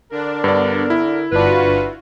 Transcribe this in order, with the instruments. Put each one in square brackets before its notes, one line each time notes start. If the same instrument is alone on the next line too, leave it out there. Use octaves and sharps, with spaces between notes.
[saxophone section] D3 A#4 [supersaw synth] D4
[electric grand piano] G2 D5 [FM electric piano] B3
[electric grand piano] E4
[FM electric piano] G1 D4 [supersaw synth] F4 F#4 [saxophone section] B4